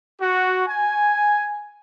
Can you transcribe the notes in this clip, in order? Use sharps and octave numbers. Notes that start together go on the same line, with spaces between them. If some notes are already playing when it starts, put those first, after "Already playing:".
F#4
G#5